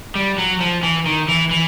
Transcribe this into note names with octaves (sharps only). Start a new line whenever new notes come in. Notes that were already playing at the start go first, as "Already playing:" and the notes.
G3
F#3
F3
E3
D#3
E3
E3